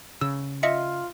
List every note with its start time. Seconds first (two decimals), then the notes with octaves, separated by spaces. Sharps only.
0.21 C#3 E6
0.63 F4 D#5 E5 C#7